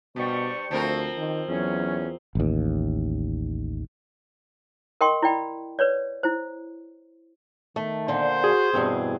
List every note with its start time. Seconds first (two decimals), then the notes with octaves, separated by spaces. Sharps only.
0.16 G2 B2 G3 C5 D5 C#6
0.71 D2 F3 C4 A#4
1.18 D#3
1.48 E2 F#3 C#4
2.35 A1 D#2
5.01 A#4 D#5 G5 C6 C#6
5.22 E4 D5 G5 B5
5.79 B4 C#5 D5
6.23 E4 C5
7.76 D#3 A3
8.08 A#2 D3 C5
8.44 F#4 G#4
8.73 E2 G2 B2 C4